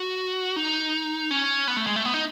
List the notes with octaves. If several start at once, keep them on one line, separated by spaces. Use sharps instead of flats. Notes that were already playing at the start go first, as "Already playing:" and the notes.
Already playing: F#4
D#4
C#4
B3
A3
G#3
A3
B3
D#4